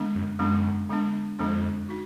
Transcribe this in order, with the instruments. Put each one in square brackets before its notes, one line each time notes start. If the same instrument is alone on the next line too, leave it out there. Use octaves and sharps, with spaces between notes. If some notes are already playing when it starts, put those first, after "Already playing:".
Already playing: [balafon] D3 G#3 B3 D4
[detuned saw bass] F#2
[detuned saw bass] F#2 [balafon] D3 G#3 B3 D4
[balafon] D3 G#3 B3 D4
[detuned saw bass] F2 [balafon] D3 G#3 B3 D4
[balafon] D#4 F#4